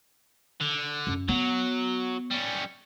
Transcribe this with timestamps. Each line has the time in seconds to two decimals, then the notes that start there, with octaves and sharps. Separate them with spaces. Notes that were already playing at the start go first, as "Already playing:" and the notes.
0.61 D3
1.07 F#2
1.28 F#3 B3
2.31 G3 C#4